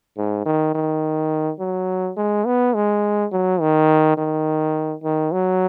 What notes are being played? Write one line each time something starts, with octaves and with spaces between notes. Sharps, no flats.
G#2
D#3
D#3
F#3
G#3
B3
G#3
F#3
D#3
D#3
D#3
F#3